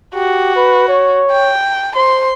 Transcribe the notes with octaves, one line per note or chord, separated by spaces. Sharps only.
F#4 G4
B4
C#5
G5
C5 C6